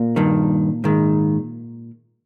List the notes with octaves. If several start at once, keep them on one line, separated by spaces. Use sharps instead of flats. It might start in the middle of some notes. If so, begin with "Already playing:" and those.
Already playing: A#2 A#3
G2 D#3
G#2 D#3